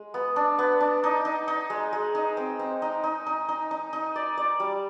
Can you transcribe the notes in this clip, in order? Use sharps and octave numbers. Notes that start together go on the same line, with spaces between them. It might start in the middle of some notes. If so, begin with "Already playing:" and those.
Already playing: G#3
B3
D4
B3
D4
D#4
D#4
D#4
G#3
G#3
D#4
C4
C4
D#4
D#4
D#4
D#4
D#4
D#4
D5
D5
G3